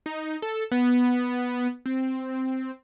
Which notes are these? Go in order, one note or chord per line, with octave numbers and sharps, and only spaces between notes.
D#4
A4
B3
C4